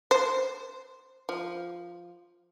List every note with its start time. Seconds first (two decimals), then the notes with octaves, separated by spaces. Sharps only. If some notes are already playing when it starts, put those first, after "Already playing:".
0.11 C5
1.29 F3